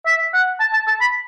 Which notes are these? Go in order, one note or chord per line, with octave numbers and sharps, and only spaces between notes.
E5
F#5
A5
A5
A5
B5